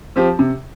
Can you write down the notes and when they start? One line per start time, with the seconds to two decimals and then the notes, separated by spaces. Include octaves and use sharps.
0.16 F3 C4 G4
0.39 C3